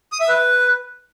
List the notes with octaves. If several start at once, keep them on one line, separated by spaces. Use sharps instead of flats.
D#6
E5
B4